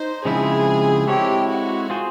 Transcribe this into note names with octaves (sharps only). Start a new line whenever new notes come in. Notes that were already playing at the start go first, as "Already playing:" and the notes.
Already playing: D#4 C5
C#3 F3 G#3 C4 E4 G#4
G#3 C4 E4 G4 A4 C#5
F#4
C4 F4 G#4 C5